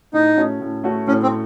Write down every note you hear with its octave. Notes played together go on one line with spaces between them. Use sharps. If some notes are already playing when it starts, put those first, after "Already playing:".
A2 D#4
A3 C#4 F#4
A2
A3 C#4 F#4
A2 C#4
C4